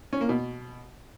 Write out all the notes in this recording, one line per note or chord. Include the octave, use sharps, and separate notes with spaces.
C#4
A#3
B2